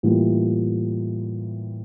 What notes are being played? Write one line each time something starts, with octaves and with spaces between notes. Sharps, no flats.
A2 E3 G3 A#3 F4